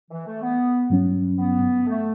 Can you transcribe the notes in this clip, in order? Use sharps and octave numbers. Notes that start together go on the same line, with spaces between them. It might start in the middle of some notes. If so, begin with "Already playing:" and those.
E3
A3
B3
G2 F#3 C#4
B3
A3